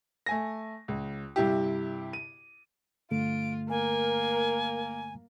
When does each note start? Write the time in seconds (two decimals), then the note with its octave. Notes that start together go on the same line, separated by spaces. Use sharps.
0.26 A3 G#5 A#6
0.88 C#2
1.36 G2 C3 E4 G4
2.13 D#7
3.11 G2 D3 A3 F4 D7
3.69 A#3 A#4 G#5